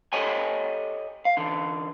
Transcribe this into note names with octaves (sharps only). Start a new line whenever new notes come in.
G4 A4 C#5 D#5 G5 G#5
F5
D3 E3